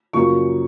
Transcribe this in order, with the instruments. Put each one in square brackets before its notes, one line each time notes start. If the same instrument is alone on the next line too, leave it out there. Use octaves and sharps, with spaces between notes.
[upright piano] F#2 C#3 F3 A#3 C#6